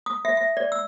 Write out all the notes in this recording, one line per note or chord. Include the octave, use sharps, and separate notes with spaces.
D#6
E5
E5
D5
E6